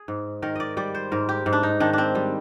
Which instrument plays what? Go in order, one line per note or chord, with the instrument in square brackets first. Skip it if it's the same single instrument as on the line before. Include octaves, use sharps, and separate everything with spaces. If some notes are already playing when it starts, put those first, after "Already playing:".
Already playing: [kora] G#4
G#2
D#3 A#4
D5 D#5
G3 D5
C5
G#2 A#4
G4
G#2
D4
D#4
D#3 D4
C4 D4
G3